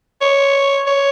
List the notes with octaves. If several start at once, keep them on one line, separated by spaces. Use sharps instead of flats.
C#5
C#5